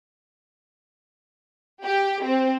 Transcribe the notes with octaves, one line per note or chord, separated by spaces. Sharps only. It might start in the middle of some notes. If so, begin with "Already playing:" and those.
G4
C4